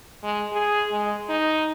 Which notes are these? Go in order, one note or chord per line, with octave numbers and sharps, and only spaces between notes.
G#3
G#4
G#3
D#4